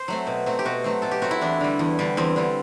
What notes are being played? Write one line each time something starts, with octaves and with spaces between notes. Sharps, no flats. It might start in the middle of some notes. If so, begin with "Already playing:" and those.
Already playing: C5
F#3 A3 C4
B2
F#3 A3 C4
G4
B2 F#4
F#3 A3 C4
B2 A4
G4
F#3 A3 C4 F#4
E4
E2 D4
D3 G3
E2
D3 G3
E2 C4
D3 G3